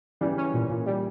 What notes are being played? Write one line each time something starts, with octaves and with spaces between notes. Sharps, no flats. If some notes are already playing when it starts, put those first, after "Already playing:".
C#3 E3 G3
C#4
A#2
A#2
G3